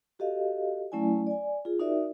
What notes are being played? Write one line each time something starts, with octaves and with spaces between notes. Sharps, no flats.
F#4 G4 A4 D#5 F5
F#3 A3 C#4 E4 D5 G#5
D5 G#5
F4 G#4
D#4 F#4 A#4 D5 E5